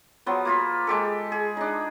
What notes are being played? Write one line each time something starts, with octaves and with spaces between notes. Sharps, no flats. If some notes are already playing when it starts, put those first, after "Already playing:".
F3 F#3 B3
A#3 F4 B5
G#3 G4 A4
G#4
D4 D#4